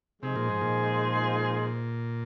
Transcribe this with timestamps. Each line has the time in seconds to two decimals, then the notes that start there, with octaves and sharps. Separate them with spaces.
0.22 C3 F3 G#3 D#4 G#4 C5
0.36 A#2
0.49 G#2
0.61 A#2